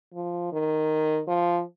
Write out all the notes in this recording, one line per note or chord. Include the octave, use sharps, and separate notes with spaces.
F3
D#3
F3